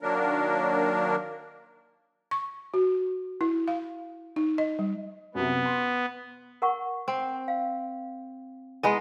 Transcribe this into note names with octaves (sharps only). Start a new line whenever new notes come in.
D#3 F#3 A#3 D4 A#4
C#6
F#4
E4
F5
D#4
D#5
G3
F#2 C3 B3
C6
A#4 F#5 C#6
C4
F5
G#3 B3 E4 D#5 G#5